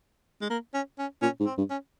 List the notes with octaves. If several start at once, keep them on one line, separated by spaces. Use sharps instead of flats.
G#3
A#3
C#4
C#4
A#2 C#4
G#2
C4
G2
C#4